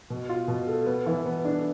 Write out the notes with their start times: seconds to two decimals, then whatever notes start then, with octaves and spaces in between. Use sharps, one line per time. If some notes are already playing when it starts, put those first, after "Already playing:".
0.10 B2
0.29 F4
0.48 B2
0.67 A4
0.86 B3
1.06 E3
1.26 B3
1.45 D4